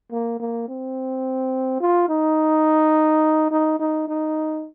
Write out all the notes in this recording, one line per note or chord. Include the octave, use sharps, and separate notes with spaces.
A#3
A#3
C4
F4
D#4
D#4
D#4
D#4